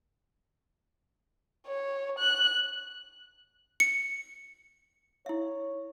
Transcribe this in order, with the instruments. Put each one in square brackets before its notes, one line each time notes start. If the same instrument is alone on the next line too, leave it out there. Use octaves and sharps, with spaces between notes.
[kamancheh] C#5
F#6
[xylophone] C#7
[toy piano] E4 E5 [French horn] C#5